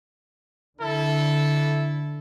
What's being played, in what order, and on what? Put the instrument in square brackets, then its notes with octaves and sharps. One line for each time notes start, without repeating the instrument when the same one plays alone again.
[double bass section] D3 [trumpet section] E4 A4